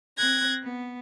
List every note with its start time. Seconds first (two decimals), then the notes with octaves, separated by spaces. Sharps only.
0.16 C4 F#6 G#6 A#6
0.63 B3